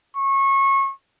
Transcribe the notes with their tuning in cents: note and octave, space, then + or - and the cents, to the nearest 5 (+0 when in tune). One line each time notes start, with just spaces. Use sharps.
C#6 -25